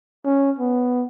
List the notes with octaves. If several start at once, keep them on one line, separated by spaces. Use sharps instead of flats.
C#4
B3